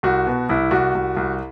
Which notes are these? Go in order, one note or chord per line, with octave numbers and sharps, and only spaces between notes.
C2 F#4
B2
C2 E4
C2 F#4
C2
C2